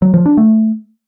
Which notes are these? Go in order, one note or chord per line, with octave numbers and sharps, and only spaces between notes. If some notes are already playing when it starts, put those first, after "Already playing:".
F#3
F3
D4
A3